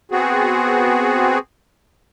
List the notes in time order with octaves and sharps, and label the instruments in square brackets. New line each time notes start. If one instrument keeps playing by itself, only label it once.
[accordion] B3 C4 F#4 G#4